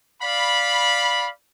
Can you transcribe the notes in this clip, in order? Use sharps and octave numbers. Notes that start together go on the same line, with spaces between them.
D5 F5 B5